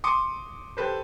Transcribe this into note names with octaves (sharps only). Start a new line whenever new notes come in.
C6 D6 D#6 C#7
G4 A4 B4 C5